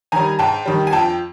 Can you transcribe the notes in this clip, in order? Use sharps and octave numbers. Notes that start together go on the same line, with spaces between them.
D#3 G3 G#5 A#5
G#2 G5 A5
D#3 G3
G#5
F2 G5 A5